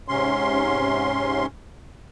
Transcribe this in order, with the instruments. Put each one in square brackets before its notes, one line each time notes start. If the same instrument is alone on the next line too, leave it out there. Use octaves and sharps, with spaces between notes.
[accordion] G#2 C3 C#4 C6